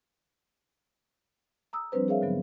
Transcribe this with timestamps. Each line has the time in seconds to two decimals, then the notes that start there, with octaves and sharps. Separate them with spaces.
1.73 A#5 D#6 E6
1.92 F3 G3 C4 D4 B4 C5
2.08 G#4 A#4 C#5 E5 F5
2.21 G#2 D3 F#3 B3